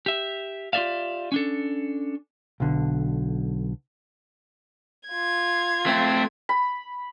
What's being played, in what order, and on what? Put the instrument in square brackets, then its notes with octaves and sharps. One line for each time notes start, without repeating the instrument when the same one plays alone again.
[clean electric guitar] G4 E5
F4 G4 G#4 D5 E5 F5
C#4 D4 A4
[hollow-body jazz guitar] B1 D3
[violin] F4 G#6
[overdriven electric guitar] A3 C4
[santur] B5